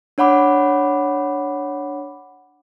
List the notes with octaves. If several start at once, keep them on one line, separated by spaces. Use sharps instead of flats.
D4 C#5 F#5 B5 D6